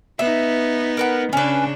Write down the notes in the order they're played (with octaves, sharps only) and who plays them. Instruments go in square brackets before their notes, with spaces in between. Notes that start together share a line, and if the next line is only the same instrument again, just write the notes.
[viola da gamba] B3 D#4 [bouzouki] E5
[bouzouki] A#4 B4 F#5
[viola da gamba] C#3 D4 [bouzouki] C#4 B4